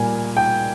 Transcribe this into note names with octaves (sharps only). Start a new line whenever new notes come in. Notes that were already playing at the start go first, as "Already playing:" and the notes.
Already playing: A#2 G3 A#3 G#5
G5